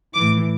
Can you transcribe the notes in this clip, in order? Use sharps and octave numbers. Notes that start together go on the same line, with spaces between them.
A2 E3 D6